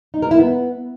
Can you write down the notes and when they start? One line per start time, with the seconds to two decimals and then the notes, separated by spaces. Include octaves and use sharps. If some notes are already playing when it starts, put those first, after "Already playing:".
0.14 D#4
0.22 A#4
0.31 E4
0.40 B3